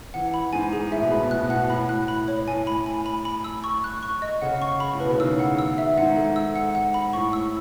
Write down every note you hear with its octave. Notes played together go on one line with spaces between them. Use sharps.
E3 F#5
B5
G#2 G#5
G#4
A2 E5
B2
A2 B5
B2
A2 F#6
B2
A2 F#5
A2 B5
F#6
B5
C#5
A2 G#5
B5
G#5
B5
B5
E6
C#6
F#6
C#6
D#5
C#3 F#5
C#6
B5
A2
B2 B4
C#3
D#3 E6
F#5
E6
E5
G#2 F#5
A4
E6
F#5
F#5
B5
A2 C#6
E6